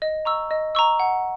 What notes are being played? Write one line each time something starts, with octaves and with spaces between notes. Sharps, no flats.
D#5
A#5 C#6 E6
D#5
A#5 C#6 E6
F#5